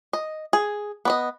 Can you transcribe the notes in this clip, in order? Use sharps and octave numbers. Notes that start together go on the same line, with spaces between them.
D#5
G#4
B3 D5 D#5